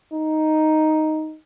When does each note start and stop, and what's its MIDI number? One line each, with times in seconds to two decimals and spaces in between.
0.14 1.36 63